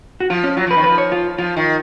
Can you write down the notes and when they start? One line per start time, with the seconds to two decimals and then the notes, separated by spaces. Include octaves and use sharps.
0.20 F#4
0.30 F3 F4
0.44 C#4
0.57 F#3 F4
0.67 F3 B4
0.76 D#3
0.84 F3 B4
0.98 C#5
1.12 F4
1.38 F3 F4
1.57 D#3